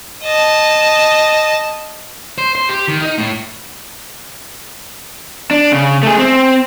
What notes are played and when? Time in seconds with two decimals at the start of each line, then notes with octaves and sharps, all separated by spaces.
0.24 D#5 A5
2.38 C5
2.55 C5
2.69 G4
2.88 D#3
3.01 D#4
3.18 A2
5.51 D4
5.72 C#3
6.03 A3 G#4
6.19 C4